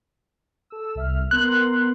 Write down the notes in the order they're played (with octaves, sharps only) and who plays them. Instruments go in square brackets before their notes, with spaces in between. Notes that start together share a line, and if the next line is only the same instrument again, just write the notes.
[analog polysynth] A4 E6
C2 E5 F6
[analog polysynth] B3 A#4 C6 [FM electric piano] F#6